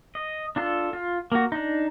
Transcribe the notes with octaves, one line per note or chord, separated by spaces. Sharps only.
D#5
D4 F4 A4
F4
A#3 F#4
D4 D#4